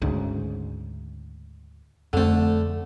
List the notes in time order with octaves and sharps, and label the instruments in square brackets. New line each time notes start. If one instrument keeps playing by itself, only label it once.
[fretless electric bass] D2 G#2 C#3
[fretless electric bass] F2 C4 [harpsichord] D3 A3